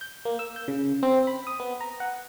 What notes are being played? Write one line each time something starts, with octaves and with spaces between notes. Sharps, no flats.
G6
A#3
E6
G6
C#3
C4
B5
D#6
B3
A#5
F#5